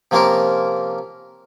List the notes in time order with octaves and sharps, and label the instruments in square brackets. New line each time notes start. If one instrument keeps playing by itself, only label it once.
[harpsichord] C3 F3 A#3 C#4 F4 A#4